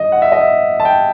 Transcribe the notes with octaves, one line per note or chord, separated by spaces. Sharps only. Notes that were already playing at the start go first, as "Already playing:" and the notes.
Already playing: G2 D#3 D#5
F#5
E5
D#5
E5
A5
G5